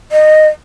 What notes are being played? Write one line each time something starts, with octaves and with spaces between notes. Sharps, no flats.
D#5